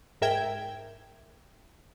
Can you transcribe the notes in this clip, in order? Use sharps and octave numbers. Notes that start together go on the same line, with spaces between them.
G#2 A#4 E5 G5 G#6